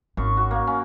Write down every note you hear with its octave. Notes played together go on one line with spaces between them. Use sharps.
G#1 F#2 C#6
F#4
A#3
C#4